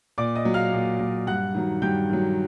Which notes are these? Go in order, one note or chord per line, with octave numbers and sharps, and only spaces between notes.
A#2 D5 D6
D#5 D#6
F#3
F5 F6
A#2
F#3
G2 F#5 F#6
D#3 F#3
G2 G5 G6
D#3 F#3